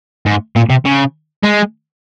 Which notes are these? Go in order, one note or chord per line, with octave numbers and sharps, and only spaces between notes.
G#2
A#2
C3
C#3
G#3